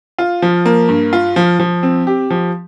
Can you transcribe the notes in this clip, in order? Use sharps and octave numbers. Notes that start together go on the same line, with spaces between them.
F4
F3
A#3
G2
F4
F3
F3
C4
G4
F3